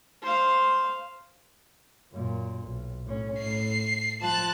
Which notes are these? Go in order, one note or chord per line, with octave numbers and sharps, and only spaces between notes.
C5 F5
F#2 A#2
B1
A2 C#4
A2 C7
F3 A5 F#6